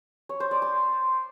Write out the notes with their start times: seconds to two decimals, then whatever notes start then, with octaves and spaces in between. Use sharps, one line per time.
0.29 C#5
0.40 C5
0.51 D5
0.62 C6